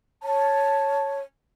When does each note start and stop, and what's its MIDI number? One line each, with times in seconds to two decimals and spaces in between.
0.23 1.21 73
0.23 1.21 81